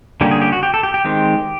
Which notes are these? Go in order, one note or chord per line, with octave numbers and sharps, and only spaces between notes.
D3 G3 A#3 C#4 G4
G#4
G4
F#4
G4
A4
G4
G4
D#3 G#3 C4